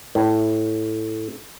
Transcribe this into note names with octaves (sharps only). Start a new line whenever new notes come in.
A2